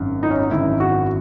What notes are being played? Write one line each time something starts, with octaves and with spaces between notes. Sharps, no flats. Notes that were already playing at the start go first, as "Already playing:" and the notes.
Already playing: G#1 F#2 D#3
D#4
C#4
D#4
G#1 F#2 D#3 E4
F#4